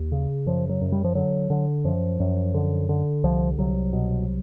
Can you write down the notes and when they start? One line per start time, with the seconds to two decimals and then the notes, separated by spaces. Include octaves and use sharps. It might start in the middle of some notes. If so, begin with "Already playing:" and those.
Already playing: D#2
0.12 C#3
0.46 F#2 F3
0.69 F#3
0.81 F#2
0.92 G3
1.04 F3
1.15 D3 F#3
1.50 D3
1.84 F#2 F3
2.20 F#2
2.54 D3
2.89 D3
3.24 C2 F3
3.58 C2 F#3
3.93 B2